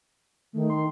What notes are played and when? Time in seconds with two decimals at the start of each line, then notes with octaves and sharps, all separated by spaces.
0.53 D#3 A3
0.70 C6